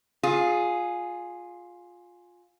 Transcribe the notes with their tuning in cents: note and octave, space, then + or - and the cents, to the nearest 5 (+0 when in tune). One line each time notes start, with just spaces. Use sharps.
F4 +15 G#4 +0